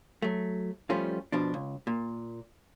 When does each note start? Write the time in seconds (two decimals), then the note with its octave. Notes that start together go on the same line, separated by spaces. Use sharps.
0.22 F#3 A3
0.90 F3 G3 A3 C#4 F4
1.32 B2 F3 D4
1.54 C#2
1.87 A#2